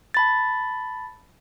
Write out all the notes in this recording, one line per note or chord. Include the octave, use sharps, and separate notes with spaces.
A5 B5 A6